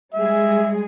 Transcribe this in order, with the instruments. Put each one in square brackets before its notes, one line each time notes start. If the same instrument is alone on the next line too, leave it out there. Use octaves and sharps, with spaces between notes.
[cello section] G3 G#3 G#4 [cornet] E5